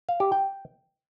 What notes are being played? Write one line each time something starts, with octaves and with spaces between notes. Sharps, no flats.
F5
G4
G5